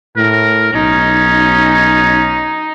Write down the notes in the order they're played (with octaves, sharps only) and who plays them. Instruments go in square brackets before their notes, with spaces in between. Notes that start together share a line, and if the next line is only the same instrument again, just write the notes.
[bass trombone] A2 [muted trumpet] A#4
[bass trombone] B1 [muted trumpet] C#4 [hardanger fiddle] D#4